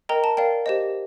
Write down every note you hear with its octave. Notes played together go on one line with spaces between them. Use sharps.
A#4 D#5 G5 A#5
A5
A#4 D5 F5 G5
G4 C5 D#5